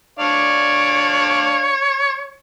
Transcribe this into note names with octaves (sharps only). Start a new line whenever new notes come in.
D4 C#5 D5 F5